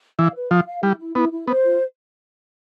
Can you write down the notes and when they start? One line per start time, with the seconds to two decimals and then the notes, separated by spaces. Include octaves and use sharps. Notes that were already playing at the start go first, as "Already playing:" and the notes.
0.19 E3 F5
0.35 B4
0.51 F3 F5
0.67 F5
0.83 G3 E4
0.99 E4
1.15 B3 E4
1.32 E4
1.47 B3 C5
1.64 F4